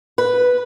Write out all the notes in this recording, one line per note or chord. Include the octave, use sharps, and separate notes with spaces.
B4